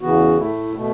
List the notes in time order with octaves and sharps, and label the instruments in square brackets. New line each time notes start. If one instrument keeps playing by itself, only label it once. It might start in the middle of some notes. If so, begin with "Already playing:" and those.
[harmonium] E2 C#3 E3 B3 F#4
A2 A3 E4
B2 A3